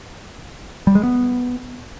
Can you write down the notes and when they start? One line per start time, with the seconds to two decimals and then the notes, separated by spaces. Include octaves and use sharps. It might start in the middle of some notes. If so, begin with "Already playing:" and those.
0.87 G3
0.95 G#3
1.03 B3